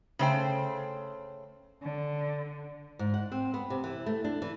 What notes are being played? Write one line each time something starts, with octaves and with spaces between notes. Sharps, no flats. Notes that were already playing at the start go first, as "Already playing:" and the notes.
C#3 A3 C5 G5
D3
G#2
F#5
C4
B3
C3
E3
A3
D4
E3